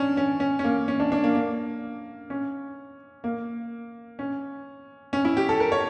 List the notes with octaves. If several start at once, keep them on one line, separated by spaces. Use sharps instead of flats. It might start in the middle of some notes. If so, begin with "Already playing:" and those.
Already playing: C#4 D4
C#4
C#4
C#4
A#3
C#4
D4
D4
A#3
A#3
C#4
A#3
C#4
C#4
E4
G4
A4
A#4
C#5